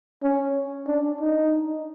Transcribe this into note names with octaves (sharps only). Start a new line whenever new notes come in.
C#4
D4
D#4